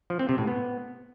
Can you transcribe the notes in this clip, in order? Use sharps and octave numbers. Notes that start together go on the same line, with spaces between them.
F3
C4
C3
A2
B3